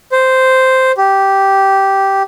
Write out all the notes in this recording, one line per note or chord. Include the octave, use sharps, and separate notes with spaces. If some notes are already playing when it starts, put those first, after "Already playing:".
C5
G4